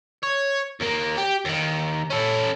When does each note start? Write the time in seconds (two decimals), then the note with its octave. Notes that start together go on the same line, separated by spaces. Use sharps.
0.23 C#5
0.81 D#2 A#3
1.18 G4
1.45 D#2 D#3
2.10 C#4 A4